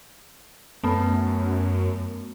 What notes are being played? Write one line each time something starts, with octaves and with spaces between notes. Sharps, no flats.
F#2 A3 B3